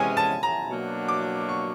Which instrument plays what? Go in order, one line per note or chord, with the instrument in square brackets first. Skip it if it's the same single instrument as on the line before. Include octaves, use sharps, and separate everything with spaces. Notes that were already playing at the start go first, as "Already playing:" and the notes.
Already playing: [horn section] C3 E3 G#3 C#4 [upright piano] G#5
[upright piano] A5
A#5
[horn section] B2 F#3 A#3 D4
[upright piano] D6
C#6